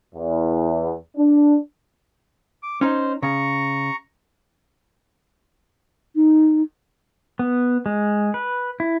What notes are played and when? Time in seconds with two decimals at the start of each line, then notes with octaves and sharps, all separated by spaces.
0.15 E2
1.17 D4
2.63 D6
2.81 C#4 D#4 C5
3.22 C#3 A#5 C#6
6.16 D#4
7.39 B3
7.86 G#3
8.34 B4
8.80 E4